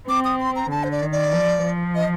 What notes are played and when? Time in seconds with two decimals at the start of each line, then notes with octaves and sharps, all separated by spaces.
0.09 C4 D6
0.25 D#6
0.40 C6
0.56 A#5
0.70 D3 A5
0.84 C5
0.91 D5
1.02 D#3
1.12 D5
1.32 F3
1.63 F3
1.95 D#5